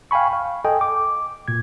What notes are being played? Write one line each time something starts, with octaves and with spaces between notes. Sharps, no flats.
F5 G5 G#5 B5 C#6
F5
A4 D#5 G5 G#5
D6
A#2 G#6